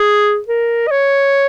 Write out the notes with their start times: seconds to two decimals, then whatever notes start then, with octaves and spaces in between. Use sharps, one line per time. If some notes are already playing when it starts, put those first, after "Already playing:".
Already playing: G#4
0.48 A#4
0.87 D#5
0.91 C#5